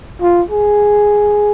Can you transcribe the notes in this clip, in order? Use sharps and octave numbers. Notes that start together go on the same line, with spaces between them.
F4
G#4